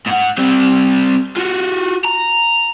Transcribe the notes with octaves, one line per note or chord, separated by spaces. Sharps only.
G#2 F#5
G3 C4
F4 F#4
A#5